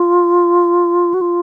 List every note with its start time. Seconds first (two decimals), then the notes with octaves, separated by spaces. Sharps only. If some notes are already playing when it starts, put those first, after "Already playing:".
Already playing: F4
1.14 F#4
1.21 F4